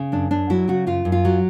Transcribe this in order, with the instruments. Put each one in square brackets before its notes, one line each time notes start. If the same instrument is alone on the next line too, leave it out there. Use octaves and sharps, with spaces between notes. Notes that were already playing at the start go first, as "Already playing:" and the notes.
Already playing: [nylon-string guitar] C#3
F#2 D4
F#2 D4
F#3 E4
C#3 F#4
F#2 F4
F#2
F4
F#3